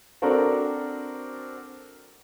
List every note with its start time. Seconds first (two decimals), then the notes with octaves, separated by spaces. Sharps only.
0.22 C4 D4 F#4 A4 A#4 F#5